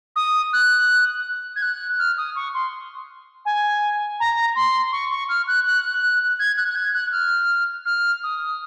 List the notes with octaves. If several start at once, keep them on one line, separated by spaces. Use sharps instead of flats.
D#6
F#6
G#6
F#6
F6
D#6
C#6
C6
G#5
A#5
C6
C#6
C#6
F6
F#6
F#6
G#6
F#6
F#6
G#6
F#6
F6
F6
D#6